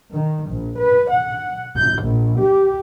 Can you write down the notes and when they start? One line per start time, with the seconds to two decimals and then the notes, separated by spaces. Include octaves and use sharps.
0.12 D#3
0.49 A#1
0.78 B4
1.11 F#5
1.77 G6
2.06 A#1
2.40 G4